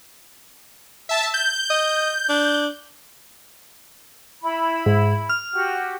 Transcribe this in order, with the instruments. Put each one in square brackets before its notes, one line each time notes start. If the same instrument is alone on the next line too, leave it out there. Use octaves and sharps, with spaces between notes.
[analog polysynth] E5 A5
G6
[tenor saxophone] D#5
D4
[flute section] E4 B5
[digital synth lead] G#2
F6
[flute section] F#4 G4